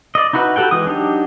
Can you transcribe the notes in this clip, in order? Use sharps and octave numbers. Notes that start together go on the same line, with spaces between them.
D5 D#5
D#4 E4 F#4 B4
F#4 G4 A4 F#5 G5
E3 G#3 D#6
F#3 D4 D#4 G4